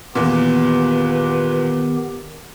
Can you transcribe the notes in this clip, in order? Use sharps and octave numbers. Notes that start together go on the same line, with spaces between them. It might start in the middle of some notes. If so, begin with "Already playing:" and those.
E2 A#2 D#3 B3 G4 B4